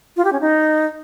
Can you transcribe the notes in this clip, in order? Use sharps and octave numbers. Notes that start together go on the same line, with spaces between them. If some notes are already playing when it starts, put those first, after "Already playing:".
F4
G4
C#4
D#4